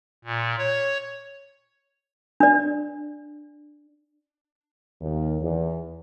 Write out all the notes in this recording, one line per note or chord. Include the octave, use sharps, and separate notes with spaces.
A#2
C#5
D4 D5
D#2
E2